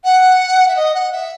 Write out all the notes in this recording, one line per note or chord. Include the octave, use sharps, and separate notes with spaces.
F#5
E5
D#5
F#5
E5